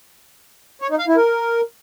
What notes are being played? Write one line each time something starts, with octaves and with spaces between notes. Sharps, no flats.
C#5
D#4
F5
E4
A#4